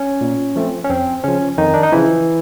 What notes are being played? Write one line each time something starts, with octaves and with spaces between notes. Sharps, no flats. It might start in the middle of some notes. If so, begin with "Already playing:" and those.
Already playing: C#4
A#2
F3 A3 C4
C#4
F2 C4
C#3 F3 C#4
F2 D#3 D#4
D4
D#4
C#3 E3 F3 E4